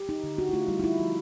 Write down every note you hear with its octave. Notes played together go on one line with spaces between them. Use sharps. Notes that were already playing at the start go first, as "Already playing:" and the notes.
Already playing: G4
D#4
D3
D4 F#4
E4
A3 F4
G3 E4
D#4
G3 E4
F3